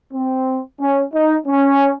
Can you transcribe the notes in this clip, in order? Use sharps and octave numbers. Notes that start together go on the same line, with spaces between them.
C4
C#4
D#4
C#4